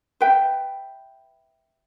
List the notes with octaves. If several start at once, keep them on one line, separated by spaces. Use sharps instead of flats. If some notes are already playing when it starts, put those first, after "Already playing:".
B4 E5 G5